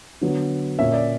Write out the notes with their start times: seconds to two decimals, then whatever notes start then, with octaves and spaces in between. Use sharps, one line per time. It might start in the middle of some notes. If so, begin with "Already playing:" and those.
0.21 D3 F#3 B3
0.79 A#2 A#3 C#4 E5
0.93 D5